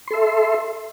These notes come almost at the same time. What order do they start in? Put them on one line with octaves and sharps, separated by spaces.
C6 A4 E5